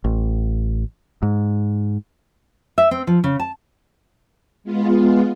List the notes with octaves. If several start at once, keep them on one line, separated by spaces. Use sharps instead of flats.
A1
G#2
E5
C4
F3
C#3
A5
G#3 B3 F4